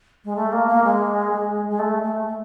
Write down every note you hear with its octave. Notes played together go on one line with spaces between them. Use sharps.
G#3
A3
A#3
A#3
G#3
G#3
G#3
A3
A3
A3